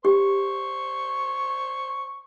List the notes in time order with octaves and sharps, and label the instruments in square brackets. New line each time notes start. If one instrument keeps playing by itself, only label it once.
[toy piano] G4 [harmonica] C5 C#6